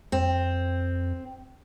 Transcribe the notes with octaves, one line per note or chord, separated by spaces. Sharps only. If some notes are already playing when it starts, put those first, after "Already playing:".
F2 C4